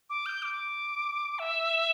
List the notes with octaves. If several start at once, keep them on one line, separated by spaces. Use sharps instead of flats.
D6
G6
D6
E5